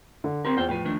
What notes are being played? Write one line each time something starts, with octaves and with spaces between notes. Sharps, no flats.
D3
C4 G4 A#4 C6
E2 F4 C5 G5
A2 F3 B4 G5
D#3 A3 D4